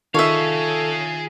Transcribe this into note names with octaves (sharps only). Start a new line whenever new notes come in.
D#3 F4 G#4 A4 C#5 E5 F5